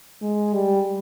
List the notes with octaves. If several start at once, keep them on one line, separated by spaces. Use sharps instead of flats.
G#3
G3